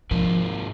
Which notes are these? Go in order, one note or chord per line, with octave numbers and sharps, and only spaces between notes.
G#2 D#3 F3 A#3